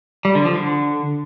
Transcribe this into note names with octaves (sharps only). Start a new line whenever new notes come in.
G3
D3
F3
D3